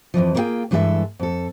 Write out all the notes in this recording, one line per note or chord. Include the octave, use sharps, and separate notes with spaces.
F2 B2 E3 F3
A#3 D4 E4 F4 G#4 G5
G2 E3 G#3 G#4 A4 E5
F2 A4